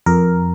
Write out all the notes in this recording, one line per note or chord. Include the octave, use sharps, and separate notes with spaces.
F2 A#4